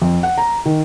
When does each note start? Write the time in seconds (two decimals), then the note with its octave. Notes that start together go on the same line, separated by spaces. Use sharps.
0.02 F2
0.23 F#5
0.38 A#5
0.66 D#3